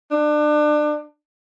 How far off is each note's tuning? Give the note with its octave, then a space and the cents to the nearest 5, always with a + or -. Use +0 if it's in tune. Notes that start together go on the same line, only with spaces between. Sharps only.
D4 +30